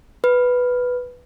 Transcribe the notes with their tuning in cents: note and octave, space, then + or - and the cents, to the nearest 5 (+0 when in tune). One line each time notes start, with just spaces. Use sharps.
B4 +0